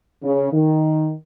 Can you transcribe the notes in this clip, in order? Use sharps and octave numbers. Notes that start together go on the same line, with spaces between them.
C#3
D#3